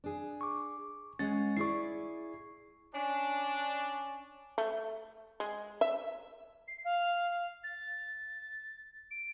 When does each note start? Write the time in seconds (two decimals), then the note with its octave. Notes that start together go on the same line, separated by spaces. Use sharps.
0.04 D4 G#4
0.41 C#6 D6
1.19 G#3 C#4 F#5 A6
1.57 E4 G#4 D5 C#6 C7
2.94 C#4 D4
4.58 A3
5.40 G#3
5.81 E5
6.67 C7
6.84 F5
7.63 A6
9.11 D7